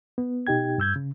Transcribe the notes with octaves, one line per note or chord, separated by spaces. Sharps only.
B3
B2 D#4 G4 G5 G#6
G2 E6 G6 G#6
C#3